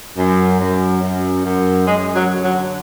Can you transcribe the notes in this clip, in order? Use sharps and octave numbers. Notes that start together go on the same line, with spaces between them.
F#2
F#2
F#2
F#2
F#2 G#3
F#3
D3
F#3